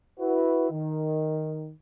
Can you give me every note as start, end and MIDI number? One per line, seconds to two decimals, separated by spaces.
0.20 0.67 64
0.20 0.67 66
0.20 0.67 71
0.71 1.72 51